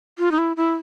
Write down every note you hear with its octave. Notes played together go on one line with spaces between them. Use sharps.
F4
D#4
E4
E4